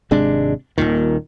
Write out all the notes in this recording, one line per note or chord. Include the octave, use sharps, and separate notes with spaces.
G#1 C3 G#3 D4
D#1 B1 A#2 D#3